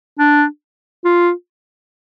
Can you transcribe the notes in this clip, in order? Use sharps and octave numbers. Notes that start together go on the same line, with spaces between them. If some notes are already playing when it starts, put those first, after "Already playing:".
D4
F4